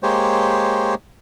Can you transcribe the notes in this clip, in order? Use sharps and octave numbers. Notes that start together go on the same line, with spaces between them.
G#3 A#3 G4 C5 C#5